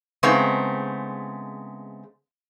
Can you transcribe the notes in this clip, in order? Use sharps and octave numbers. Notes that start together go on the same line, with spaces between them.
C#3 G#3 A3 B3 C4 D#4